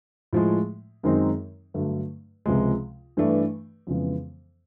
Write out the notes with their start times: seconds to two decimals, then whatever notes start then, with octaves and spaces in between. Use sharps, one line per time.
0.33 A2 F3 G#3
1.03 F#2 D#3 G#3 C4 D#4
1.74 G2 D3 F#3 A3
2.46 C#2 C3 F3 G#3
3.17 G2 E3 A3 D4
3.87 F2 C#3 E3 G#3 B3